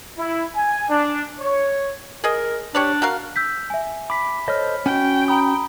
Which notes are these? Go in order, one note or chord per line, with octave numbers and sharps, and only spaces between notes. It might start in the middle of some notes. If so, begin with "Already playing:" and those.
E4
G#5
D4
C#5
G#4 A#4 D#5
D4 G4 C#5 D5
F#4 A#4 F5
E6 G6 B6
E5 G#5
B5 D6 B6
A4 C5 C#5 D#5 F6
C#4 F#4 G5
A#5 B5 D#6